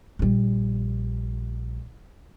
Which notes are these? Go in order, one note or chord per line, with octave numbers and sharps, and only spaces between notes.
A#1 G3